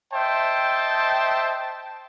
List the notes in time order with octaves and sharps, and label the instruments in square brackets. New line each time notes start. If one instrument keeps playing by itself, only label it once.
[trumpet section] C5 D#5 E5 G5 A5